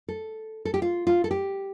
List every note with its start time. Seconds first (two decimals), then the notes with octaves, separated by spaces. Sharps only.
0.08 A4
0.65 A4
0.74 G4
0.82 F4
1.07 F4
1.24 A4
1.31 G4